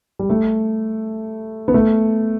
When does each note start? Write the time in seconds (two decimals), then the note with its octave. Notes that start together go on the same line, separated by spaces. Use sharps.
0.19 G3
0.30 A3
1.68 B3
1.74 A3